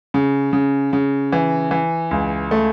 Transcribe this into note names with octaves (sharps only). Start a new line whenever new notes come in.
C#3
C#3
C#3
E3
E3
C#2
A3